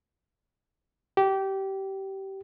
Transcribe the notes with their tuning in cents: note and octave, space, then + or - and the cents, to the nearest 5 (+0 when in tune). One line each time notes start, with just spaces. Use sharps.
G4 -20